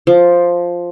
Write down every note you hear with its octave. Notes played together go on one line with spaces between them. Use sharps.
F3